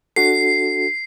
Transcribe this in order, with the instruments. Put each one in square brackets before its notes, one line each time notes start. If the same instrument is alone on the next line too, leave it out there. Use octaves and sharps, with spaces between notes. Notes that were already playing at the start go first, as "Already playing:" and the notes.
[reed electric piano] D4 F#4 A4 [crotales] C7